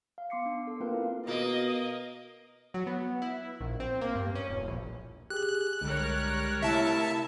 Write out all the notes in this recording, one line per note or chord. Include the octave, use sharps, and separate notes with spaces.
F5
B3 C6 D6 C7 C#7
D4
A4
A#3 C4 F4 A#4 B4 F5
E4
B2 A#3 D#5
F#3
B3
E4
A#1
C4
A#3
G2
C#4
E1
A#1
G4 G#4 F#6
C2 D3 G3 G#3 A#4 C#5
C3 A3 E4 E5 A5